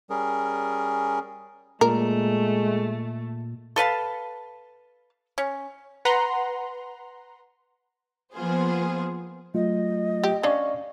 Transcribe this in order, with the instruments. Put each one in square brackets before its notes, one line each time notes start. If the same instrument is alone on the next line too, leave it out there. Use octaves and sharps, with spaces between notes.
[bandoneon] G3 C#4 G#4 A#4
[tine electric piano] A#2 [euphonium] G#3 [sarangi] A3 [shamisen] A#4
[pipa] A4 B4 F5 A5
C#4
[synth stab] B4 F#5 A#5 C6
[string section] F3 A#3 B3 F4 G#4 C5
[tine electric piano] F#3 A3 F4 [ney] D#5
[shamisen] G4
[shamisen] C#4 D4 [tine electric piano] D5 F5 C#6